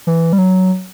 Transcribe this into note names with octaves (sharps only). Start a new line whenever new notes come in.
E3
G3
F#3